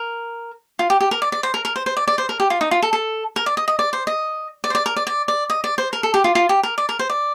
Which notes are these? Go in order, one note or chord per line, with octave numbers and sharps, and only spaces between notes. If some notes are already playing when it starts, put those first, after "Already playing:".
Already playing: A#4
F4
G4
G4
A#4
D5
D5
C5
A#4
A#4
C5
C5
D5
D5
C5
A#4
G4
F4
D#4
F4
A4
A4
A#4
D5
D#5
D#5
D5
C5
D#5
D5
C5
D5
A#4
D5
D5
D5
D#5
D5
C5
A#4
A4
G4
F4
F4
G4
A#4
D5
A#4
C5
D5